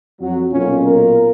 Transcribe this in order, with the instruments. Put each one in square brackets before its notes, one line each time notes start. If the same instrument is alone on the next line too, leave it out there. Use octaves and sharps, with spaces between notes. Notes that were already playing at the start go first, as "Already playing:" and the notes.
[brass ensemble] F2 F#3
[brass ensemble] B1 A#2 F4 [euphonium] C#4
[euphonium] A#4